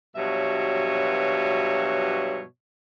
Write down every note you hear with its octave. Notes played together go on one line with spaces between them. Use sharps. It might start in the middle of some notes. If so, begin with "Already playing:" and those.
G2 B2 F3 F#3 C#5 E5